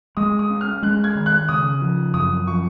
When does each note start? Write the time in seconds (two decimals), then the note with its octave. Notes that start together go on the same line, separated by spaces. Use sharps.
0.17 G#3 D#6
0.39 D#6
0.50 C#4
0.61 F6
0.83 G#3 F#6
1.04 G#6
1.15 D#3
1.26 F#6
1.49 C#3 D#6
1.81 F3
2.14 F#2 D#6
2.47 F3 C#6